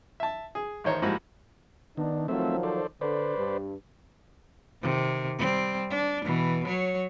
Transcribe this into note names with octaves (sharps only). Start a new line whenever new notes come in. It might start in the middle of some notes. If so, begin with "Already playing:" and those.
E5 A5
G#4
A1 D#3 C5 C#5 A#5
G#2 F3 G3 A#3 E4 F#4
D#3 B3 D4
D#3 F3 F#3 A3 C4 E5
A4 C5 D5
D3 B4 C5 D5
G2
C3 D#3
G3 C4
D4
B2 E3
F#3 C#5